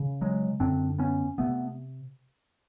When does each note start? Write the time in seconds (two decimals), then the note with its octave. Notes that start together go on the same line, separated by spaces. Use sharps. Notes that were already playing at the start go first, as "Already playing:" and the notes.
Already playing: C#3
0.21 F#3 G#3
0.60 F#2 D3 C4 D4
0.98 B3 C#4
1.38 C3 A3 B3